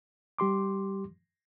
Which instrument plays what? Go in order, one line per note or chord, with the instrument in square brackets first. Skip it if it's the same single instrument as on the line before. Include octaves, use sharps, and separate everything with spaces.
[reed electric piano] G3 G4 C6 D6